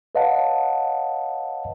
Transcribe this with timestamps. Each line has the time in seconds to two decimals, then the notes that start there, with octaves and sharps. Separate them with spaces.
0.15 B4 C#5 D#5 F5 F#5 A5